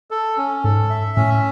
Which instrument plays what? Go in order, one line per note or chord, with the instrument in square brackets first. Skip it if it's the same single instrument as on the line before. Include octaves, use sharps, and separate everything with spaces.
[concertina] A4
C#4
[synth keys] G#2 [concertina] A4
[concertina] E5
[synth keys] A2 [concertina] C#4